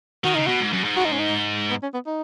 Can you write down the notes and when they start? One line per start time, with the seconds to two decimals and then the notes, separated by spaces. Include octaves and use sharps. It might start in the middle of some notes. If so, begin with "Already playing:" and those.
0.24 D#3 F#4
0.35 C#3 D#4
0.47 B2 F#4
0.61 G#2
0.73 F#2
0.84 G#2
0.97 F#4
1.05 D#4
1.12 C#4
1.19 D#4
1.70 B3
1.83 C#4
1.94 B3
2.06 D#4